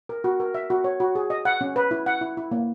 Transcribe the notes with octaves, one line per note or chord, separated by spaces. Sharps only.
A#4
F#4
A#4
E5
F#4
C#5
F#4
G#4
D#5
F#5
C#4
B4
E4
F#5
E4
E4
A#3